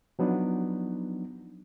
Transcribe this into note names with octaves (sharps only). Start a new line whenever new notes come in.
F3 F#3 B3 D4 D#4